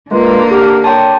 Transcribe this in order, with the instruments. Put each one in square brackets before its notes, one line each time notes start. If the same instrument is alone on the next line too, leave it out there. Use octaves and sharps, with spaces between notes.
[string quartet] D3 A#3 [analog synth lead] G#3 [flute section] F4 B4 C6
[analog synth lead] G4 [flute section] F#5 A5 F6
[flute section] C#5 C6 [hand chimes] G5 A5